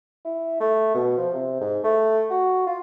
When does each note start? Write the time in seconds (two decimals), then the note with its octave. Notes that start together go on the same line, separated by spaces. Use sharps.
0.25 E4
0.60 A3
0.95 B2
1.18 F3
1.33 C3
1.61 G#2
1.84 A3
2.30 F#4
2.67 F4